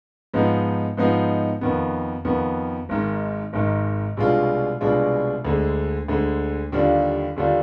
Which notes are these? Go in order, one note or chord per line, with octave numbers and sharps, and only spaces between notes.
G#2 F3 B3 D#4
G#2 F3 B3 D#4
F2 D#3 B3
F2 D#3 B3
G#1 G#2 D#3
G#1 G#2 D#3
C2 B2 G#3 D4 F4
C2 B2 G#3 D4 F4
D2 D3 G#3
D2 D3 G#3
D#2 D3 G3 D4 F4
D#2 D3 G3 D4 F4